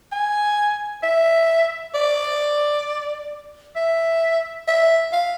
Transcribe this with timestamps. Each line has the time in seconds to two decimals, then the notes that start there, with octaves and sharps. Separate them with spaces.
0.12 G#5
1.03 E5
1.94 D5
3.76 E5
4.67 E5
5.13 F5